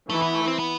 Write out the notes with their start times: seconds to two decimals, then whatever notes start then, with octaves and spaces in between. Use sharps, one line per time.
0.10 E3 A3 E4
0.22 B3
0.34 A3
0.47 C4
0.59 B3